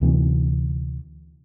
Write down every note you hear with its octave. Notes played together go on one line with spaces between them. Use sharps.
D2 C3 E3